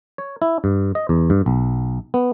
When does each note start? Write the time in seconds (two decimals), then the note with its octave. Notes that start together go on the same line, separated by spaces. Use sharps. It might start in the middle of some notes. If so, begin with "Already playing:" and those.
0.18 C#5
0.42 E4
0.64 G2
0.95 D#5
1.09 E2
1.30 G2
1.46 B1
2.14 B3